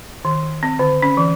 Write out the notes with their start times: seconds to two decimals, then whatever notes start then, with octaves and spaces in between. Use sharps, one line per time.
0.25 D#3
0.63 C4
0.79 D3
1.02 C#4
1.17 E3